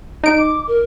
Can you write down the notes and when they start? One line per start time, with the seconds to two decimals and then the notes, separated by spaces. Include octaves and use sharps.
0.24 D#4 D7
0.38 D6
0.67 A#4